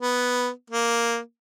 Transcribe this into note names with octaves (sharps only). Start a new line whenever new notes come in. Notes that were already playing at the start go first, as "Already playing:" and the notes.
B3
A#3